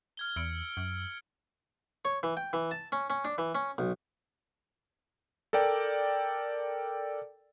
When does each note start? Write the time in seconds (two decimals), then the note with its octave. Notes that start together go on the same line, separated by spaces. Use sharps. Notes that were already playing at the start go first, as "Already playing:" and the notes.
0.17 F6 G#6 G7
0.36 E2 E6 C#7 D7
0.77 F#2
2.05 C#5
2.23 E3
2.37 G5
2.53 E3
2.71 A5
2.92 C#4
3.10 C#4
3.25 D4
3.38 E3
3.55 C#4
3.78 B1
5.53 A4 A#4 D5 G5